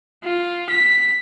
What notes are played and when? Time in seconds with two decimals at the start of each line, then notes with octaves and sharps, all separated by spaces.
0.23 F4
0.69 B6